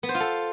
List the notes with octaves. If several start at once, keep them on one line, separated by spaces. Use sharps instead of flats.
B3
C5
F4
A4